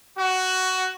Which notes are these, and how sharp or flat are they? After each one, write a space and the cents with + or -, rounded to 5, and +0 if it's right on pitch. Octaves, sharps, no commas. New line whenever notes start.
F#4 +10